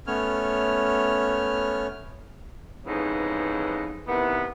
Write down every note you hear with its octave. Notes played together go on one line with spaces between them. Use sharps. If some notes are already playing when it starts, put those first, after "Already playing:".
A3 B3 C#4 C#5 F6
F2 G#2 C#3 E3 B3 D#4
C3 D#3 E3 B3